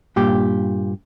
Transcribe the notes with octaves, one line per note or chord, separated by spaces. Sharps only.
G2 A#2 G4